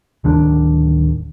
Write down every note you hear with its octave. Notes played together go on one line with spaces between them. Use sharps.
D1 D#3 D4